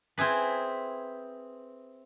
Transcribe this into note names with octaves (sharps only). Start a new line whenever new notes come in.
C4 E4 G#4 B4